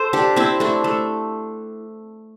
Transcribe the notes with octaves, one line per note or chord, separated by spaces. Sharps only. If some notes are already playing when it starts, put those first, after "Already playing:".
Already playing: A4 C5
D4 G4
C4 E4
A3 D4
A3